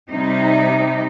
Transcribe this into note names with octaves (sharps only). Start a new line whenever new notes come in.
C3 G3 D#4